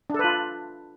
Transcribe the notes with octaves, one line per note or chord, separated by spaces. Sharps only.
D4 F4 A4 B4